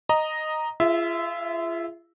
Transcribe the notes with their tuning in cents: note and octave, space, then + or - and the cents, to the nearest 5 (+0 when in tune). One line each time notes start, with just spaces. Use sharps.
D#5 -5 A#5 +0
F4 -35 G#4 +0 E5 +0